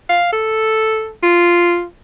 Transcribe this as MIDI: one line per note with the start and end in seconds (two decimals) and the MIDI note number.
0.09 0.29 77
0.33 1.10 69
1.23 1.84 65